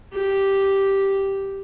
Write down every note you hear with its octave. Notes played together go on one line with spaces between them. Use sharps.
G4